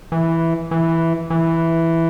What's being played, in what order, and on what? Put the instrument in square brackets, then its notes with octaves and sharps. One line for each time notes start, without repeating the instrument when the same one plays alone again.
[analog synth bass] E3
E3
E3